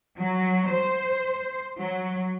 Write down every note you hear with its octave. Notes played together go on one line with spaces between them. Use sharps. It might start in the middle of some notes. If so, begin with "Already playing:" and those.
F#3
C5
F#3